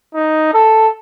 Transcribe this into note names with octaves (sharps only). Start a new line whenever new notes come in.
D#4
A4